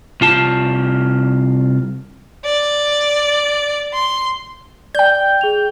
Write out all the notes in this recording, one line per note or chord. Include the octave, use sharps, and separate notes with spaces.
C2 F4 A5
D5
C6
D5 G5 G6
G#4 F7